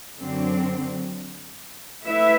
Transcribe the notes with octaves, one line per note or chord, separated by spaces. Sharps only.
F#2 D3 F#3 C4
A3 E4 B4 E5